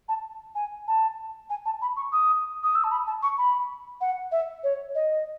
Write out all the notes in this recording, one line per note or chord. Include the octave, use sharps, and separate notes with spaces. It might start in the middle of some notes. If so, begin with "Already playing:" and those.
A5
G#5
A5
G#5
A5
B5
C#6
D#6
D#6
E6
A5
B5
A5
C#6
B5
F#5
E5
C#5
D#5